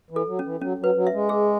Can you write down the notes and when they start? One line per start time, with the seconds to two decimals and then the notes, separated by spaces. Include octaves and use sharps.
0.11 E3
0.16 A4
0.27 F#3
0.39 C#4
0.44 E3
0.61 F#3 C#4
0.79 F#3 B4
0.96 F#3
1.07 E5
1.12 G#3
1.29 G#4